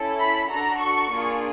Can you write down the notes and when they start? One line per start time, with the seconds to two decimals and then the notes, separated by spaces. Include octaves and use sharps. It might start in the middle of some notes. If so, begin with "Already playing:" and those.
Already playing: C#4 E4 A4
0.20 B5
0.50 D4 F#4 A4 A#5
0.80 C#6
1.10 A#3 D4 F4 G#4